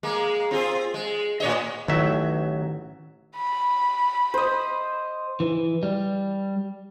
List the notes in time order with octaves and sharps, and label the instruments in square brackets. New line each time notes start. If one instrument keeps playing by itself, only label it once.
[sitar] G#3 A#3
C4 F4 G#4
G#3
A2 C#5 D#5
[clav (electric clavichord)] A1 F#3 E5 [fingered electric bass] D#3
[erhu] B5
[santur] C5 D#5
[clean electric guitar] E3
G3